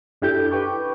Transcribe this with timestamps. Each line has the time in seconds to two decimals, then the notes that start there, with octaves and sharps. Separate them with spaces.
0.22 F#2 D4 E4 G4 A4 G6
0.51 B4 G5 C#6 D6